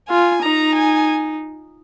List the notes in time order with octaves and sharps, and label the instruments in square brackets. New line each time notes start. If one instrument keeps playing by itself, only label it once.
[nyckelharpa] F4 [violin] G#5
[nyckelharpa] D#4 [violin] A#5
[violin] G#5